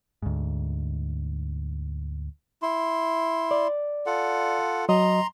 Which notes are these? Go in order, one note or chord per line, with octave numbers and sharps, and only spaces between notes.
D2 G#2
E4 C6
D5
F4 A4 F#5
F#3 D#5 A#5 C6